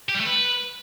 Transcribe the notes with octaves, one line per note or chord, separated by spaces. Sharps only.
G4
G3
A3
B4